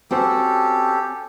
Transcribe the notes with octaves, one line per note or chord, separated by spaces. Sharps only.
C4 C#4 F#4 G4 A4 C5